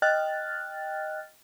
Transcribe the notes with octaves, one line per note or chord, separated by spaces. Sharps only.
D#5 G5 F6 F#6 A6